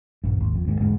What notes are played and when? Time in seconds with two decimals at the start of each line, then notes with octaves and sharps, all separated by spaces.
0.24 A#1 G2
0.37 G#1 D#2
0.55 F2
0.66 D#2 G#2 D3 D#3
0.80 E1 G#2 D3 G#3